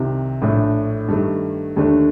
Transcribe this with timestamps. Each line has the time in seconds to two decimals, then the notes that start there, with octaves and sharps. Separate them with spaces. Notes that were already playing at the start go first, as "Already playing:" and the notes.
Already playing: C2 C3 D#3
0.42 A#1 A2 A3 D4
1.09 G2 D#3 A3
1.76 D#2 D3 A3 D4